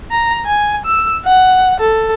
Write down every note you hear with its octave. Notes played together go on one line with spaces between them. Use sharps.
A#5
G#5
E6
F#5
A4